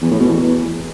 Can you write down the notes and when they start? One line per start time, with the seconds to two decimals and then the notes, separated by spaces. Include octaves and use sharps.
0.02 E2
0.11 A2
0.20 B2
0.29 E2